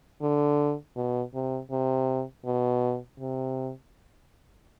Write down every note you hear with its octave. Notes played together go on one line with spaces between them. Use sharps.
D3
B2
C3
C3
B2
C3